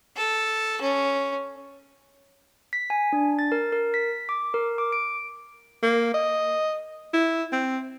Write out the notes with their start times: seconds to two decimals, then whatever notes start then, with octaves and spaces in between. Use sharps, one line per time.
0.17 A4
0.81 C#4
2.73 B6
2.90 G#5
3.13 D4
3.39 A6
3.52 A#4
3.72 A#4
3.94 B6
4.29 D6
4.54 A#4
4.78 D6
4.92 D7
5.83 A#3
6.14 D#5
7.14 E4
7.52 C4